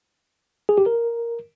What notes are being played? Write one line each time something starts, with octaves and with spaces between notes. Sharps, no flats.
G#4
G4
A#4